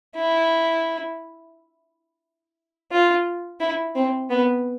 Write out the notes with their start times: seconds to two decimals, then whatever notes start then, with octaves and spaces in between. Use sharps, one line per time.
0.16 E4
2.92 F4
3.60 E4
3.95 C4
4.30 B3